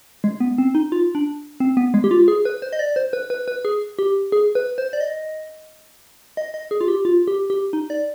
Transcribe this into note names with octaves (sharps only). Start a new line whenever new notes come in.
G#3
B3
C4
D#4
F4
D4
C4
B3
G#3
G4
F4
G#4
B4
C5
D#5
D5
C5
B4
B4
B4
G#4
G4
G#4
B4
C5
D5
D#5
D#5
D#5
G#4
F4
G4
F4
G4
G4
D#4
D5